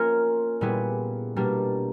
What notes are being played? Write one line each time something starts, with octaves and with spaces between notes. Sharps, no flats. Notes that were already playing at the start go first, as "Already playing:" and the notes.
Already playing: A#3 C#4 F4 A#4
A#2 G3 B3 E4 G#4
B2 G3 A#3 D4 G4